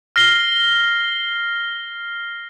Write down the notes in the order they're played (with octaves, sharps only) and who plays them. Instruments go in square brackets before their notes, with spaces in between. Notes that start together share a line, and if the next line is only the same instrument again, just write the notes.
[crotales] F6 A#6 C7 G7